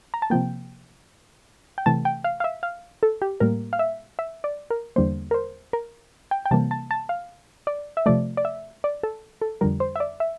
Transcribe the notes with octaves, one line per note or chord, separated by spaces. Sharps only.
A#5
A5
C3 F3 A#3 G5
G5
C3 E3 A3 A5
G5
F5
F5
E5
F5
A4
G4
A2 G3 A#3 A#4
F5
E5
E5
D5
A#4
E2 D3 G3 A#3 C5
A#4
C5
A#4
G5
G5
C3 E3 G3 A#3 A5
A5
A5
F5
D5
E5
C3 F3 A3 D5
D5
E5
D5
A4
A4
F2 D3 G3 A#4
C5
E5
D5
E5